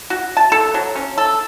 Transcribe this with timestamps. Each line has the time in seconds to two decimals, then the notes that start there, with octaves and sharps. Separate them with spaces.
0.10 F#4
0.37 A5
0.52 A4
0.74 F#3
0.95 C#4
1.18 A4